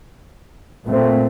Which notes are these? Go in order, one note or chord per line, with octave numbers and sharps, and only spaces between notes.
A#2 A3 C4